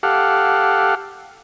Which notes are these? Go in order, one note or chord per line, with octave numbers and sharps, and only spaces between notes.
G4 A4 F5 F#5